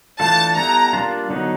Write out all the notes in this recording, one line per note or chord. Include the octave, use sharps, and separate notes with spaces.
E3 A3 D4 F4 A4 A5
G3 B3 E4 A4 A#5
G3 A#3 D4 F4
D3 F#3 B3 D#4